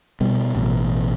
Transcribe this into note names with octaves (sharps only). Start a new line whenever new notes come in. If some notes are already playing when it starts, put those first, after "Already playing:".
B2 G3
A1 B2